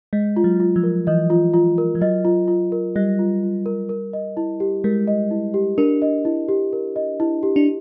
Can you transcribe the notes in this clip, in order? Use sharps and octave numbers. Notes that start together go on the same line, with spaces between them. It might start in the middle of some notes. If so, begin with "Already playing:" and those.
G#3 D#5
F4
F#3
F4
F3
A#4
E3 D#5
F4
F4
A#4
F3
F#3 D#5
F4
F4
A#4
G3 D#5
F4
F4
A#4
A#4
D#5
E4
G4
G#3 A#4
D#5
E4
G4
D4 A#4
D#5
E4
G4
A#4
D#5
E4
G4
D4